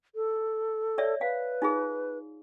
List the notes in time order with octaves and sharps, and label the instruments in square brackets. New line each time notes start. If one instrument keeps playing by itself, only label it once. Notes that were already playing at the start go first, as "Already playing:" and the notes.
[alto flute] A4
[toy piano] C#5 D5 E5
[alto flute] B4 [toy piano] F5
[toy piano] D#4 F4 G#4